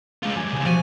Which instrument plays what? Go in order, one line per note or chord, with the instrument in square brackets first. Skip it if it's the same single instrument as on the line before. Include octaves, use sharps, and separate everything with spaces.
[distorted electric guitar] G#3 F4
[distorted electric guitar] F#2 [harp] G4 G#5
[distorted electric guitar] B1 C#3
[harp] F3 B3 F#4 [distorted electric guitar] G#5